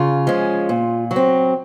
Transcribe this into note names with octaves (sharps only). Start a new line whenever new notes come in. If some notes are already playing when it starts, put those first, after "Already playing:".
Already playing: C#3 F4
F3 G#3 C#4
A#2
F#3
C4